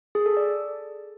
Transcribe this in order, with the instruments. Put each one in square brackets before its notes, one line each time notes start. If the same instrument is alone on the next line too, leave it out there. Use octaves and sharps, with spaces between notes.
[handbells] G#4
A4
D5